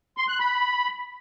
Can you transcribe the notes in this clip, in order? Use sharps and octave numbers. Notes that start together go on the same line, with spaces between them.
C6
F#6
B5